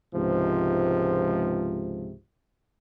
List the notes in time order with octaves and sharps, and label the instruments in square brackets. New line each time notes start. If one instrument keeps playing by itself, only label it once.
[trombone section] C#2 G#2 C3 F3